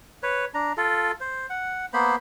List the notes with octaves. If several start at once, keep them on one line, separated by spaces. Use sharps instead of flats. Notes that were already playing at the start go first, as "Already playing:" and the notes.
B4 C#5
D4 A#5
F4 A4
C5
F#5
A#3 B3 C5 B5